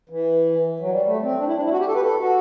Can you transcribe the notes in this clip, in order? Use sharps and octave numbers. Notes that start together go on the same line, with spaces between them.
E3
F#3
G3
A3
C4
D4
E4
D4
E4
F#4
G4
A4
B4
A4
F#4